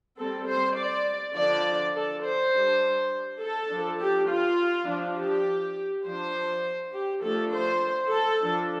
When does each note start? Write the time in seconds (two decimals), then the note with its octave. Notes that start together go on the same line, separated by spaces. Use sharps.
0.19 G3 C4 A4
0.47 C5
0.78 D5
1.36 D3 F3 D4 D5
1.95 A4
2.25 C5
2.53 G3 D4
3.41 A4
3.71 F3 D4
4.01 G4
4.30 F4
4.87 F3 D4
5.18 G4
6.05 F3 D4 C5
6.93 G4
7.22 F3 A3 D4 A4
7.53 C5
8.10 A4
8.40 F3 D4